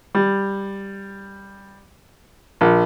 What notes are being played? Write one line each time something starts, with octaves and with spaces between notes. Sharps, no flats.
G3
A#1